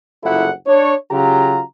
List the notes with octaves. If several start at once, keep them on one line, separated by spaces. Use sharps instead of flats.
F#1 C2 E4 F4 A4 F#5
D4 C#5
C#3 F#3 F4 G4 A#5